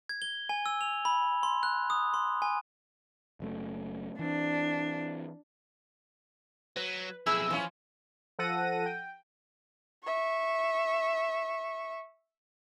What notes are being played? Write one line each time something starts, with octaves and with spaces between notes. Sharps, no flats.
G#6
G7
G#5
E6
F7
B5
C6
F#6
D#6
C6
G#5
F#1 F#2 A3
E3 C4 D4
F#3 B4
B1 F2 E4 G#4 E6
E3 F3 C#4
F3 A4 F#5 A#6 D#7
G5
E5 C#6